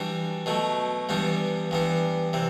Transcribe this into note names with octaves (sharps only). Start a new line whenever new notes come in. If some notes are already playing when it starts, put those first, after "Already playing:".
Already playing: E3 G3 D4 F#4
B2 F#3 A3
G2 E3 G3 B3
G2 E3 B3
C3 E3